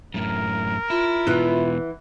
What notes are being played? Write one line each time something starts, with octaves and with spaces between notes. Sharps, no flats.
F#2 A2 A#4
E4 F4
E2 B2 E3 B3